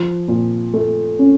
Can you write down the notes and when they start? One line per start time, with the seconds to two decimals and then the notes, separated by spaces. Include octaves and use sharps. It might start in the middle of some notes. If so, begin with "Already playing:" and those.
Already playing: F3
0.28 A#2
0.74 A3
1.19 C#4